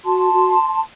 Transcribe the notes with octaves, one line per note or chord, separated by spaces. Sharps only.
F#4 A5 C6
F#4